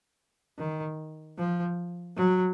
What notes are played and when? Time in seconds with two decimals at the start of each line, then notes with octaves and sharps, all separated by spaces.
0.58 D#3
1.38 F3
2.16 F#3